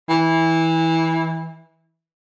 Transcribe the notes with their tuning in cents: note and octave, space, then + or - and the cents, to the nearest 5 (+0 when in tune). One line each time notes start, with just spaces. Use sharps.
E3 -15